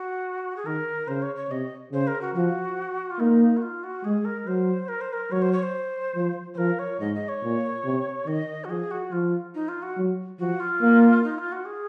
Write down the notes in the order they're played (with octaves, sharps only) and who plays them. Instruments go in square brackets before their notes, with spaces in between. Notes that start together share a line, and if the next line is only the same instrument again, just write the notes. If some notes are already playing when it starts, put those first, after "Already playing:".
Already playing: [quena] F#4
G#4
[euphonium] D#3 [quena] A#4
[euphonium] C#3 [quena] C5
[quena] C#5
C#5
[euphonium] C3 [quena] D#5
[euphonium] C#3 [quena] C5
[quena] A#4
F#4
[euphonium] F3 [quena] F#4
[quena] F4
[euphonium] A#3 [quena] D#4
[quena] F#4
F4
F#4
[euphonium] G#3 [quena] G#4
[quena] A#4
[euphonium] F#3 [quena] C5
[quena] A#4
C5
A#4
[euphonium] F#3 [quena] C#5
[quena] C5
C#5
C5
[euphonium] F3
[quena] C5
[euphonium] F3 [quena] A#4
[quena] C#5
[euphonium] G#2 [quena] D#5
[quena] D#5
C#5
[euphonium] A#2
C3
[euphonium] D#3 [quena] D#5
[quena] F#4
[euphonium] F3 [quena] G#4
[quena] F#4
[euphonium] F3 [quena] F4
[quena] D#4
F4
F#4
[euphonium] F#3
[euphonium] F3 [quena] F#4
[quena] F4
[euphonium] A#3
[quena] D#4
F4
F#4
G#4